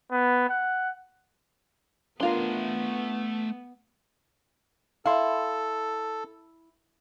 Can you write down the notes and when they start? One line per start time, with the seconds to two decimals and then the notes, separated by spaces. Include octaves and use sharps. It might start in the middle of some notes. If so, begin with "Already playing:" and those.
0.12 B3
0.49 F#5
2.20 A3 B3 D4 F4 A#4 C6
5.06 E4 A4 F5 C6